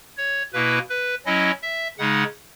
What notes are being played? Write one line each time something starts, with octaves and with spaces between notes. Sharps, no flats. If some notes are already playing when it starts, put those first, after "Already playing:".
C#5
B2 A#3 E4 B4
B4
F#3 C#4 E4 D#5
E5
C#3 G#3 D#4 F#5